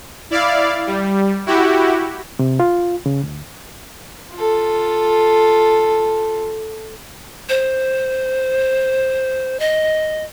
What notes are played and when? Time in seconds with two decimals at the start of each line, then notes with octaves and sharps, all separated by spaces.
0.30 E4 D5 F5
0.87 G3
1.46 E4 F#4 G4
2.39 C3
2.60 F4
3.06 C#3
3.23 D2
4.34 F4 A4
7.49 C5
9.60 D#5